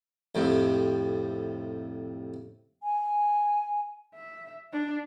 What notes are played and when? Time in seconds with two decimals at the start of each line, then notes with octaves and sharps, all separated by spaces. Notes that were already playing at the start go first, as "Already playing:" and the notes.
0.35 F2 A2 C3
2.83 G#5
4.15 E5
4.73 D4